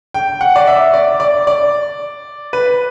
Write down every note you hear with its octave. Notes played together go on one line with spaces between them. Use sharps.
G5
F#5
D5
E5
D5
D5
D5
B4